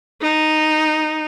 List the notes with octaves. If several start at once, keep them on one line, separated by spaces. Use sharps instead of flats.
D#4